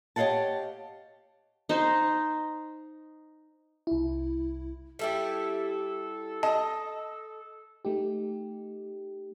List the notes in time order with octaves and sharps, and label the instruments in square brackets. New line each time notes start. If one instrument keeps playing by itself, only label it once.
[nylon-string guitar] G4 C#5 D#5 F5 F#5 A5
[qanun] D#4 C5
[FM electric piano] C2 E4
[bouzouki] G3 E4 G4 [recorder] A4
[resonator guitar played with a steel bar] D#5 [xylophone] A5
[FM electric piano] A3 D#4 G4